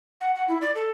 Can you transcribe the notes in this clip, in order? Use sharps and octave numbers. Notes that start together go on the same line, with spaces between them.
F#5
F#5
E4
D5
A4